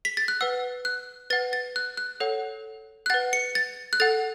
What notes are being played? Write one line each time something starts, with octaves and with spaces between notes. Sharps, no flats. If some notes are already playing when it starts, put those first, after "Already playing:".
B6
A6
F#6
B4 F#5 E6
F#6
B4 F#5 A6
A6
F#6
F#6
A4 C#5 F#5
F#6
B4 F#5 A6
C#7
A6
F#6
A4 F#5 A6